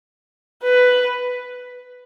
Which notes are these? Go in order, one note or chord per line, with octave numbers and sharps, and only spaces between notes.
B4